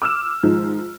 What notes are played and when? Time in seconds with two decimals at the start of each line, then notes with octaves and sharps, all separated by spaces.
0.02 D6 E6 F6 E7
0.43 G#2 D#3 F3 G#3